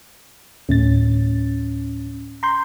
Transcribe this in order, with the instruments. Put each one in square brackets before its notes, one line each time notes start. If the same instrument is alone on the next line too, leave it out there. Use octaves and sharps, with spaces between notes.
[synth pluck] D2 A2 A6 [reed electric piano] C#4
[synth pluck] A#5 C6 G6